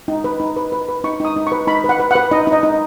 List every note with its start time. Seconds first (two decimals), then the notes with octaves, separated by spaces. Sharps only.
0.08 D#4
0.24 B4
0.40 D#4
0.56 B4
0.72 B4
0.89 B4
1.04 D#4 C#6
1.20 D#4 D#6
1.36 D#4
1.47 B4 C#6
1.67 D#4 B5
1.84 B4
1.89 F#5
2.00 B4
2.11 B4 F#5
2.31 D#4 D#5
2.47 D#4
2.52 D#5
2.63 D#4